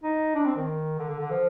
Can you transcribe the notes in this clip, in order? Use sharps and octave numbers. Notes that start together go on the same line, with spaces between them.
D#4
D4
C4
D#3
D3
D3
D3
F3